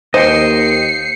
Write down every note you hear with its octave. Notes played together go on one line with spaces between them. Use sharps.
D#2 C5 D#5 G5 C7 C#7